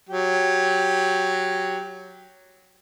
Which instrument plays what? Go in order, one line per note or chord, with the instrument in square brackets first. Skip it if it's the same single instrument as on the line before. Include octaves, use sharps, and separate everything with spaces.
[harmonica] F#3 G4